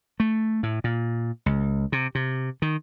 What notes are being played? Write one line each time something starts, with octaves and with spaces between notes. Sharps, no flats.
A3
A2
A#2
C#2
C3
C3
D#3